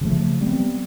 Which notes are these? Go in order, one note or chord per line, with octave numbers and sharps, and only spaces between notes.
C#3 F3 A3
G3 B3 C4